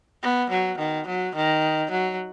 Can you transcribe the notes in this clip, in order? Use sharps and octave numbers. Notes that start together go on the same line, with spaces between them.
B3
F#3
D#3
F#3
D#3
F#3